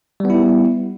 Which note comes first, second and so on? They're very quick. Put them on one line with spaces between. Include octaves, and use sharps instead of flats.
G3 B3 E4